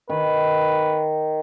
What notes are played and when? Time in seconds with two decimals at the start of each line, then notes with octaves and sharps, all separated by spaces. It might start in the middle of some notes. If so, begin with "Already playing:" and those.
0.10 D#3 B4